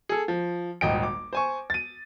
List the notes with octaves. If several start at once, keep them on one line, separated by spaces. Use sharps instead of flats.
G#4 A4
F3
D#1 G#1 D#5 G5 D7
D6
C5 G#5 C#6
A6 D#7